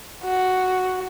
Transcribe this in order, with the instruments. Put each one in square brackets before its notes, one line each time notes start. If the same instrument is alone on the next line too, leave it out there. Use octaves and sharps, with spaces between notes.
[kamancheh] F#4